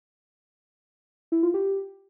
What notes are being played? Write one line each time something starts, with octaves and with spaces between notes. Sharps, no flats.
E4
F4
G4